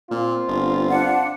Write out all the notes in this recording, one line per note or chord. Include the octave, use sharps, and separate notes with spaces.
A#2 C4 F4
G1
D4 F#5